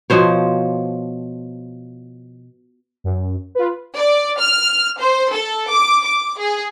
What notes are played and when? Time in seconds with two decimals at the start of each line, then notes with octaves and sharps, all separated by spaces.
0.10 B2 F3 C5 C#5
3.04 F#2
3.55 F4 B4
3.97 D5
4.39 F6
5.00 C5
5.32 A4
5.69 D6
6.04 D6
6.39 G#4